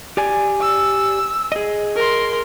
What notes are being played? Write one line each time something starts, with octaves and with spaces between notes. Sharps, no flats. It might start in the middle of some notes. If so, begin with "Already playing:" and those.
G4 D5 G#5
E6
G#4 D#5
A#4 C6